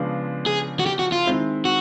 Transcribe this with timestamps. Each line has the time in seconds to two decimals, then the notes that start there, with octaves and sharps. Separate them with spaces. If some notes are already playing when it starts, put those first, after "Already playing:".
Already playing: C#3 F3 G#3 B3 D4
0.46 G#4
0.80 F#4
0.86 G4
0.99 F#4
1.12 F4
1.26 D#3 G#3 C4 E4
1.65 F#4